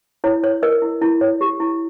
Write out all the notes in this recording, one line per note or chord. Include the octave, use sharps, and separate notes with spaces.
E4 C#5
C#5
A#4 D#5
E4
E4
C#5
G4
E4